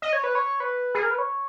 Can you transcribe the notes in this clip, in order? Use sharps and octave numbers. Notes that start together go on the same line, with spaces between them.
D#5
C#5
B4
C#5
B4
G#4
A#4
B4
C#5